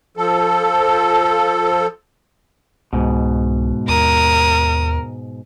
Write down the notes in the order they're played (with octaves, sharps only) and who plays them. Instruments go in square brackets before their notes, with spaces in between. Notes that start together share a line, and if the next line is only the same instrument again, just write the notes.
[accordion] F3 A4
[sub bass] C2 [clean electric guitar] G#2 B2
[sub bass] D#2 [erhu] A#4 [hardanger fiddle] D#6